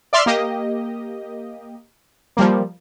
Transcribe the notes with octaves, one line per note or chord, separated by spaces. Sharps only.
D5 E5 C6 F6
A#3 G4 D#5
F3 G3 A#3